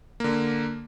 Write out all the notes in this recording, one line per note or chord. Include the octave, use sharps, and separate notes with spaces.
D3 A#3